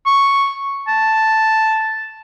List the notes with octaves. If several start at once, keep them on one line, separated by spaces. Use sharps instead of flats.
C#6
A5